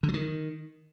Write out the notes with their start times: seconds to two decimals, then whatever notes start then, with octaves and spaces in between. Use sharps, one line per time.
0.03 D3
0.08 F#3
0.14 D#3